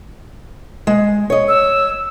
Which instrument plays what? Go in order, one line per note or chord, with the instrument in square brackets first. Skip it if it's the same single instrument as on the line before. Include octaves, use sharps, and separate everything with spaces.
[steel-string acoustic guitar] G#3
C#5 D#5
[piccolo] E6